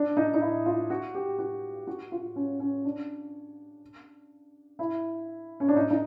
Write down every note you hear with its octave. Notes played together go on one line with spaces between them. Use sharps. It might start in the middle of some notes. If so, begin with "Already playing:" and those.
Already playing: D4
D#4
D#4
E4
F4
F#4
G4
F#4
F#4
F4
C#4
C#4
D4
E4
C#4
D4
D#4
D#4